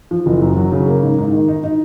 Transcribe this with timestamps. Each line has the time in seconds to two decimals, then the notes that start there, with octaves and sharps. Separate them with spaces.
0.11 F3
0.26 F#1
0.42 F#2
0.57 F#3
0.72 C#3
0.88 A#3
1.02 G#2
1.18 G#2
1.32 D#3
1.48 D#4
1.64 D#4